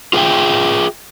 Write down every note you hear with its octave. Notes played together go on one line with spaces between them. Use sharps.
F4 G#4 A4 E5 G5